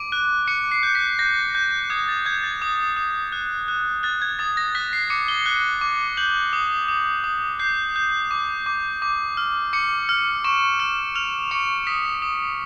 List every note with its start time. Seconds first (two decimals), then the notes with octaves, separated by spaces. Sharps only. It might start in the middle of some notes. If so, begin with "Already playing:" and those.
Already playing: D6 D7
0.12 F#6
0.48 D6 C#7
0.71 C7
0.83 G6
0.95 B6
1.19 G6 A#6
1.55 G6
1.90 D#6 G#6
2.08 A6
2.26 G6 G#6
2.44 A6
2.62 D#6
2.96 D#6
3.32 F#6
3.68 F#6
4.03 F#6 A6
4.22 G#6
4.39 D#6 A6
4.57 A#6
4.75 F#6 B6
4.93 C7
5.10 D6 C#7
5.28 G7
5.46 F#6
5.81 D6
6.17 G6 F#7
6.53 D#6
6.88 D#6
7.24 D#6
7.59 G6 C7
7.96 G6
8.31 D6
8.66 D6
9.02 D6
9.37 F6
9.73 D6 C#7
10.09 F6
10.44 C#6 E7
10.80 F6
11.15 F6 F7
11.51 C#6 C#7
11.87 D#6 B6
12.22 D#6